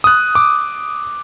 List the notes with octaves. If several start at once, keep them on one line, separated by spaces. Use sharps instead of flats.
D#6 F#6
D6